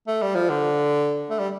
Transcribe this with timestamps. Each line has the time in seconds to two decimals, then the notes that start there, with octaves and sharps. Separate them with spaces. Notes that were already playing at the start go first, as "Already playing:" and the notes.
0.07 A3
0.22 G3
0.35 F3
0.49 D3
1.30 A3
1.39 G3